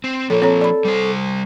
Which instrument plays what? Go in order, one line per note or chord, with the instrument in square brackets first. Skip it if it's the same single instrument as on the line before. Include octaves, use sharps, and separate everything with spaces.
[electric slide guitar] C4
[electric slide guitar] F3 A#3 [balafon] A4 [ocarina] C#5
[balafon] C4 C#5 A#5 [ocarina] A4
[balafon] D5 B5
[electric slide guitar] G3 C5